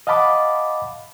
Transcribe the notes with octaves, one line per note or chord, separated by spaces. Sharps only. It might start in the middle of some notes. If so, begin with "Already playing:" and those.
D#5 F5 F#5 A5 B5 D6